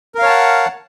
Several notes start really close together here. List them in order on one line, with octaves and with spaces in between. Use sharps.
A#4 F5 C#5 A5 F#5